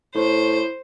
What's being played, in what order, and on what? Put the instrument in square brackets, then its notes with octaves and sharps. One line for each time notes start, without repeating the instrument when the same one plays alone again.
[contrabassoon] A2 [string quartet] C5